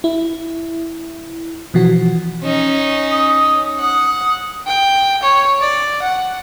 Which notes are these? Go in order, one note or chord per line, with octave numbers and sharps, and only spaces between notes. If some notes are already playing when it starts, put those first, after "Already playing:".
E4
B2 E3 F3 F#4
C#4 D#4
D#6
F#5
G5
C#5
D5
F#5